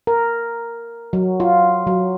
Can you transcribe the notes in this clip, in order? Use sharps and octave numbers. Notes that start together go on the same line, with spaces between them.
A#4
F#3
F4
F#3